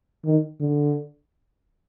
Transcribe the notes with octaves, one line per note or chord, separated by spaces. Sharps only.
D#3
D3